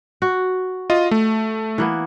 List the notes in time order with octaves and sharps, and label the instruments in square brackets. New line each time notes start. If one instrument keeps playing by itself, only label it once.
[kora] F#4
[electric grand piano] F4 D#5
A3
[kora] E3 A#3 B3